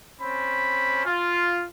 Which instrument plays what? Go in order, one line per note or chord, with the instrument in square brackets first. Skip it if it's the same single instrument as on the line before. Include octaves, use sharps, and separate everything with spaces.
[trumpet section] C4 C#4 B5
F4